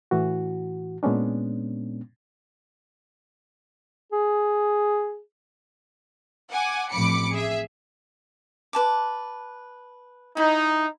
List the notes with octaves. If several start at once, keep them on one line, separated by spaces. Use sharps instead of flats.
A2 E3 F#4
A#2 G#3 B3 C#4 D4
G#4
F#5 G#5 D6
A1 F2 F3 B5 D6 C#7
G#4 E5
B4 A5 D6
D#4 E4